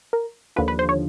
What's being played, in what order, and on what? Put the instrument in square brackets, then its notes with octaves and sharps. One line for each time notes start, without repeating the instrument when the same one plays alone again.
[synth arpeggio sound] A#4
D#2 D3 F3 B4
B4
C5
C#5